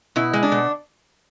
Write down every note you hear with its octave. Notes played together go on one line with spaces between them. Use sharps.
B2 E4
G#3
D4
B2